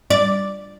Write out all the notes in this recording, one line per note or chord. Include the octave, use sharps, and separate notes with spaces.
D5